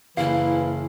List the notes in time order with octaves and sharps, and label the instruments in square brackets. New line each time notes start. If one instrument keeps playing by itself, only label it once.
[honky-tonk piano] F#1 [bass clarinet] E3 [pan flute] E4 [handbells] F5